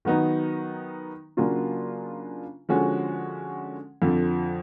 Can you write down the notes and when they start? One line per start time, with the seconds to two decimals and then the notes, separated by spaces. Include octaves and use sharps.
0.05 D#3 F#3 B3 D#4
1.37 C#3 F#3 A#3 D4 F4
2.69 D3 F3 G#3 C#4 F#4
4.02 F2 D3 F3